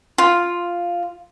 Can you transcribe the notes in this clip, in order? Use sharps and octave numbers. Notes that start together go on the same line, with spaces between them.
F4